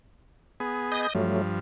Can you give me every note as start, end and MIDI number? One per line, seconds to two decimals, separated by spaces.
0.60 1.07 59
0.60 1.07 68
0.92 1.13 75
0.92 1.13 87
0.92 1.13 91
1.15 1.60 43
1.15 1.60 53
1.15 1.42 54
1.15 1.42 57